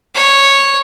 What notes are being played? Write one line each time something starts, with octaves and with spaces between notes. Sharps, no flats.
C#5